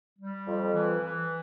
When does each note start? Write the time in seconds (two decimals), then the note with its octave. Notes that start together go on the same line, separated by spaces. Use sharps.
0.19 G3
0.47 F2
0.73 E3
1.00 E3